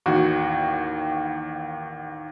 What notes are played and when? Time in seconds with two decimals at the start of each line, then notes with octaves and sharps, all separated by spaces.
0.06 A1 D#2 F#4